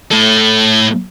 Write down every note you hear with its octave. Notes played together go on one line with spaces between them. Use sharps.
A2 A4